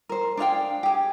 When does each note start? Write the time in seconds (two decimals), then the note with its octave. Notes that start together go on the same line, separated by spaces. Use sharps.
0.09 A#4 C5
0.37 D4 G#4 F5 G5
0.83 G4 G#4